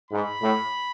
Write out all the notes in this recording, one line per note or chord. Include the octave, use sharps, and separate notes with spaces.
G#2 B5
A2